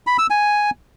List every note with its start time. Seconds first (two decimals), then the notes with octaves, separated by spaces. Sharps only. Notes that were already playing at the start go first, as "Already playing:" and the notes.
0.07 B5
0.19 E6
0.30 G#5